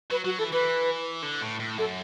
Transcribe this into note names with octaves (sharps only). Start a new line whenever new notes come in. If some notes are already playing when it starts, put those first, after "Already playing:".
F#3 B4
F#3 F#4
E3 A4
E3 B4
D3
A2
A2
F#2 A4